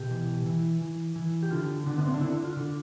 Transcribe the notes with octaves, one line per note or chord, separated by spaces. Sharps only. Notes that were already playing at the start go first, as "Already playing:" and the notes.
Already playing: B2 G4
E3
E3
E3
E3
G4
D3 F4
D3 D4
B3
C4
D4
D3 E4
F4
D3